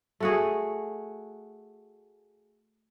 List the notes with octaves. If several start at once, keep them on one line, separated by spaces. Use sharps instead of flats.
A3 F#4 G#4